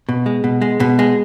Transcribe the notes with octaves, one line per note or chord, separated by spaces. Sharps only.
B2
G#3
B2
G#3
B2
G#3